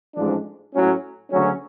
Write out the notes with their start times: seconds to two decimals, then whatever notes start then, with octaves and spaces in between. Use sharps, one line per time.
0.15 A1 G#2 F3 G#3 D4
0.73 A2 F#3 C#4
1.31 D2 C#3 F#3 C#4